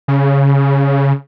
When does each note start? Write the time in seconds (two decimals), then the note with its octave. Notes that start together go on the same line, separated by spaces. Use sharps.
0.08 C#3